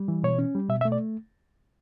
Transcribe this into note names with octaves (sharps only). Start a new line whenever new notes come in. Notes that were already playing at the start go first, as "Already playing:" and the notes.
Already playing: G3
E3
B2 C#5
C#4
G3
B2 E5
E5
A3
D5